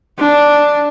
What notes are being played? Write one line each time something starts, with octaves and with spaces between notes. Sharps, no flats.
D4